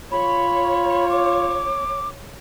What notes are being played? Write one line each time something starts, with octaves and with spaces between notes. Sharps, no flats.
F4 C#5 B5
D6